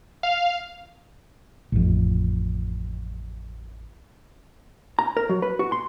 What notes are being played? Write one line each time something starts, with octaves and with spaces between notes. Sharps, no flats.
F5
A1 F2
A#5
A#4
F#3
B4
F#4
C6